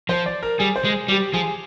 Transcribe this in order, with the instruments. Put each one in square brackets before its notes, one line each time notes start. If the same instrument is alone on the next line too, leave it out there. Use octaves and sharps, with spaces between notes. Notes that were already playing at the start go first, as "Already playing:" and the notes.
[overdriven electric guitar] F3 [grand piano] C5
[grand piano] D5
A#4
[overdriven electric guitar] G3 [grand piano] G#4
[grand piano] C5
[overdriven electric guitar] G#3
[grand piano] G#4
[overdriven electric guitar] G3 [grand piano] G4
[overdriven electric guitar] F3 [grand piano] G#4